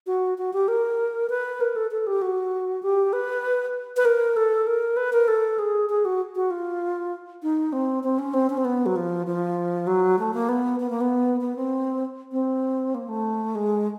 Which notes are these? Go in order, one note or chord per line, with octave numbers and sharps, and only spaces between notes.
F#4
F#4
G4
A#4
B4
A#4
A4
A4
G4
F#4
G4
B4
B4
A#4
A4
A#4
B4
A#4
A4
G#4
G#4
F#4
F#4
F4
D#4
C4
C4
C#4
C4
C#4
C4
B3
F#3
F3
F3
F#3
A3
A#3
B3
B3
A#3
B3
B3
C4
C4
A#3
A3
G#3